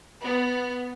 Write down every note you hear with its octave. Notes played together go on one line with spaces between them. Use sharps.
B3